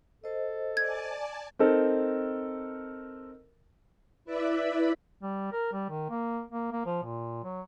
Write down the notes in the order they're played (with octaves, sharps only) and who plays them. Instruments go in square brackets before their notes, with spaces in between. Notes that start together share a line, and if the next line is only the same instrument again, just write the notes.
[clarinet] A4 [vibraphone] C5 D#5
[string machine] D5 G#5 A5 [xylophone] G#6
[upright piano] C4 D#4 A4 A#4
[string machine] E4 B4 D5 E5 B5
[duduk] G3
A#4
G3
D#3
A#3
A#3
A#3
F3
A#2
F#3